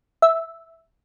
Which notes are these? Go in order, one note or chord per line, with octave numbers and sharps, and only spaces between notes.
E5